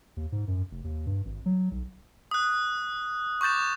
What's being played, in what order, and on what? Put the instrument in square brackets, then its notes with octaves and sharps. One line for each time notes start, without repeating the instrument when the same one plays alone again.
[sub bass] D#2
G#2
F#2
F1
D#2
G2
G#1
F#3
B1
[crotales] D#6 F#6
C#6 D6 G6 A6 E7